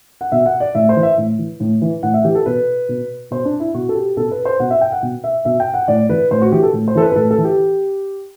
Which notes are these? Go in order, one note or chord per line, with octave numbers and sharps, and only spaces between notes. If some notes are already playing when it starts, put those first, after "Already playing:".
F#5
B2 E5
F#5
D5
A2 E5
C5
E3
E5
A2
E3
A2
E3
A2 F#5
E5
E3 G4
A4
B2 B4
B2
B2 C5
D4
E4
B2 F#4
A4
G4
B2 A4
B4
C5
B2 F#5
E5
G5
F#5
B2
E5
B2 E5
G5
F#5
A2 D5
E3 B4
A2 C5
F#4
E3 G4
A4
A2
C5
E3 A4
B4
B4
A2 A4
A4
E3
G4